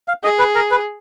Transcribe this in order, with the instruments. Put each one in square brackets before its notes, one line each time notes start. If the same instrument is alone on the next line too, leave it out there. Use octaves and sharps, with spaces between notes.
[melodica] F5
[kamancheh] G#4 [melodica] D#5
[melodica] B4
A#4
B4